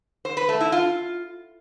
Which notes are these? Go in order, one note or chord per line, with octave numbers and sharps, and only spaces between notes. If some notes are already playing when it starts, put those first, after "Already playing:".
C5
B4
A3
E4
F4